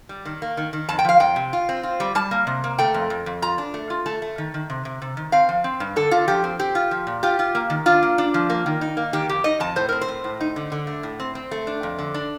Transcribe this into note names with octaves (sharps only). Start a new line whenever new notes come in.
G3
D#3
A#3
D#3
D#3
F2 A5
G5
F3 F5
F2 G5
C3
F4
C4
F4
G3
G3 A5
A#3
C3
A#3
A3 G5
F2
F2
F2
F4 A#5
D4
A3
F4
A3 A5
A3
D#3
D#3
C3
C3
C3
D#3
C4 F5
F3
C4
G2
D3 A4
D3 F4
F3 G4
C4
C4 G4
F4
F3
A#2
F4 G4
F4
A#3
D#3
D4 F4
A#3
D4
F3
A#3
D#3
D#4
A#3
D#3 G4
F2 G4
D#4 D#5
F2 A5
A2 C5
C4 A#4
C5
A2
A2
D#4
D3
D3
A3
A2
C4
C4
A3
D4
F2
D3
D4